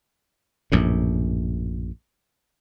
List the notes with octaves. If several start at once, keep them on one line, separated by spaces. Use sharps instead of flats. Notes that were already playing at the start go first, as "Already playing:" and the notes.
A#1 F#2 A2